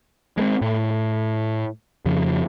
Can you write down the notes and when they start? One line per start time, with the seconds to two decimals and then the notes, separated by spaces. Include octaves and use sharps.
0.37 G#3 A#3 C4
0.61 A2
2.05 F2 C#3 F3